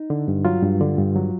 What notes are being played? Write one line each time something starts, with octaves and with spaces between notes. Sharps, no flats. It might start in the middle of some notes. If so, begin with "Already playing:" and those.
Already playing: D#4
D3
G2
F#3 F4
G2
D3
G2
F#3